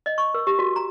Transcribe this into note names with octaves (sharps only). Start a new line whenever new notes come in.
D#5
C#6
A#4
G4
F#4
A#5